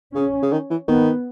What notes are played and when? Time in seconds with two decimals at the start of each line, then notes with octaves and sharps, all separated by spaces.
0.14 C#3 C#4
0.43 C#3
0.52 D#3
0.70 E3
0.88 D#3 B3